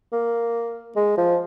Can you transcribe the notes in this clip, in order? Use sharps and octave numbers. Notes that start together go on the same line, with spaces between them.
A#3
G#3
F3